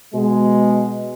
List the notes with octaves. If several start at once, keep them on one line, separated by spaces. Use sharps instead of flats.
B2 G#3